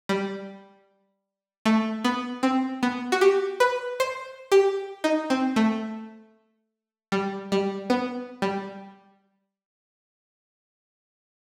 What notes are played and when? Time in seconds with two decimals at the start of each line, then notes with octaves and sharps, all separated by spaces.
0.09 G3
1.65 A3
2.04 B3
2.43 C4
2.83 B3
3.12 F#4
3.21 G4
3.60 B4
4.00 C5
4.52 G4
5.04 D#4
5.30 C4
5.56 A3
7.12 G3
7.52 G3
7.90 B3
8.42 G3